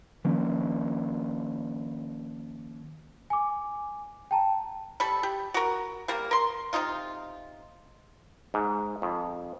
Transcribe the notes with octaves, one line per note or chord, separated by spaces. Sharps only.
D#3 F3 A#3 C#4
G#5 D6
G5 A5 A#5
G3 A4 B5
G4
F#4 A#4
G3 A#3 A#4
A#4 C6
C3 D#3 D#4 F4
G#2
F2